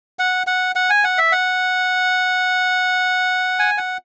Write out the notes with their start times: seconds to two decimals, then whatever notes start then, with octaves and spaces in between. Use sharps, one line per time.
0.19 F#5
0.47 F#5
0.76 F#5
0.90 G#5
1.04 F#5
1.18 E5
1.32 F#5
3.59 G#5
3.78 F#5